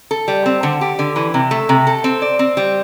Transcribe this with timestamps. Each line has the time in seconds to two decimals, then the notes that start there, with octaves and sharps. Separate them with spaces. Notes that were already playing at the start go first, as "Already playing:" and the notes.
0.11 A4
0.28 G3
0.46 C4
0.63 D3
0.81 G4
0.99 D3
1.16 E3
1.34 C3
1.51 A3
1.69 C3
1.87 A4
2.04 C4
2.22 D5
2.39 C4
2.57 G3